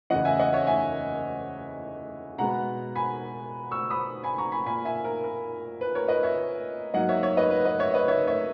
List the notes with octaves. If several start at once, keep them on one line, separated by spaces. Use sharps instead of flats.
E2 C#3 E3 D#5 F#5
E5 G#5
D#5 F#5
C#5 E5
E5 G#5
B2 G#3 B3 F#5 A#5
G#5 B5
C#6 E6
B5 D#6
G#5 B5
A#5 C#6
G#5 B5
A#2 A#3 G#5 B5
E5 G#5
A#4
A#4
B4
A#4 C#5
B4 D#5
C#5 E5
G#2 F#3 A#3 D#5 F#5
C#5 E5
C#5 E5
B4 D#5
B4
B4 D#5
C#5 E5
B4 D#5
C#5 E5
C#5 E5